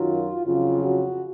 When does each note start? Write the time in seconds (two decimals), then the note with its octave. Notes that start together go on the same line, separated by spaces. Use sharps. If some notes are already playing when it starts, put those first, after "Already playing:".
Already playing: F#2 D#3 F#3 F4
0.45 F2 C#3 F#3 F4
0.84 F#4